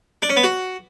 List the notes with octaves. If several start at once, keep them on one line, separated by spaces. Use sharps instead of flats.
D4
C#4
B3
F#4